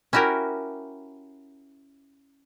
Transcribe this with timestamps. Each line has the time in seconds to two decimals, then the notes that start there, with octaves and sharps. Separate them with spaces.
0.13 C#4 E4 F#4 G4 A#4